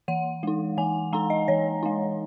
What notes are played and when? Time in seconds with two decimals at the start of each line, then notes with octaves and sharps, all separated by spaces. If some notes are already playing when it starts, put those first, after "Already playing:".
0.08 E3 F#5
0.43 G#3 D#4
0.77 E3 G#5
1.13 G#3 D#4 A#5
1.30 D#5
1.48 E3 C#5
1.83 G#3 D#4